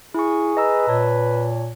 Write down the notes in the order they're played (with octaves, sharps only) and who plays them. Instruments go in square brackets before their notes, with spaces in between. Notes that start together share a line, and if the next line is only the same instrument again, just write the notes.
[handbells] E4 C#6 [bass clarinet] G#4
[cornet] B4 [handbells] D#5 A#5 E6
[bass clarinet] A#2 [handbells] C#5 A5